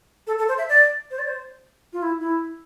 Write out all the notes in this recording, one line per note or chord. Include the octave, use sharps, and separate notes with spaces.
A4
A4
C5
E5
D5
C5
D5
C5
F4
E4
E4